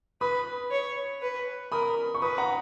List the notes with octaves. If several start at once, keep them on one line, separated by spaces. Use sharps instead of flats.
B4 B5 D#6
C#5
B4
A#4 B5 D#6
C#6
B4 B5 D#6
F#5 A#5